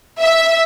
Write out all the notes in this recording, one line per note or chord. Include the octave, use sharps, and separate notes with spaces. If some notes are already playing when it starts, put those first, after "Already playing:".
E5